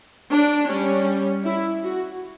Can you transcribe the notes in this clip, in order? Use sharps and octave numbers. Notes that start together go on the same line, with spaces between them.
D4
G3 C#4
E4
F#4